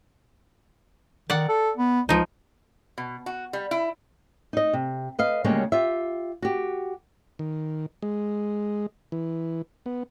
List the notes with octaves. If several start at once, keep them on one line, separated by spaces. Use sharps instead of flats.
D#3 D5 F#5
A4
B3
C#2 F3 D#4
B2
F#4
G3
E4
D#4 D#5
C3
B4 D#5 F5
D2 C#3 G3 G#3 A#3 C#4
F4 G4 E5
F#4 G4
D#3
G#3
E3
B3